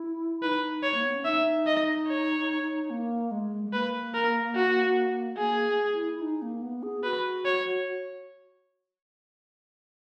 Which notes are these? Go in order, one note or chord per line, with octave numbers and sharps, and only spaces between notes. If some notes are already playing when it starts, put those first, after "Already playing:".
Already playing: E4
D#4 B4
C#5
A#3
B3
C#4
D#4 E5
D#5
C#5
A#3
G#3
G#3
A#3 B4
A#4
F#4
A#3 G#4
E4
E4
D#4
A#3
B3
G#4
F#4 B4
C#5